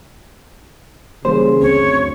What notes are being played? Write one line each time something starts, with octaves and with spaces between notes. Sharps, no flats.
C#3 E3 G3 A#3 C5
F#1 D2 C4 C#5